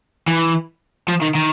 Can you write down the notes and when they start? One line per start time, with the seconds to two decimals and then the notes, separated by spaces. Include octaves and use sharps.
0.28 E3
1.08 F3
1.21 D#3
1.35 D#3